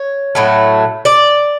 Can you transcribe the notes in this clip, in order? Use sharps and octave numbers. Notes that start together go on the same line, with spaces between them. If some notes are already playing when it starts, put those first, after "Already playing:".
Already playing: C#5
A2 F#3 A3
D5